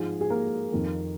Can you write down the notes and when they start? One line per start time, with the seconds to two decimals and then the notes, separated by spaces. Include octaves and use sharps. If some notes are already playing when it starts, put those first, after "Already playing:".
Already playing: G#2 F3 G#3 G#4
0.21 G#4
0.30 A#3 A#4
0.72 F2 D#3